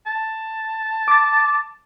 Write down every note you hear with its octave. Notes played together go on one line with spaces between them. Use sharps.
A5
D6 A6